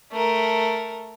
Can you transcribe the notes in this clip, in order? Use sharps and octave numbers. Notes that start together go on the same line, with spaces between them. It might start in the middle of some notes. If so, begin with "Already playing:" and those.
A3 A#4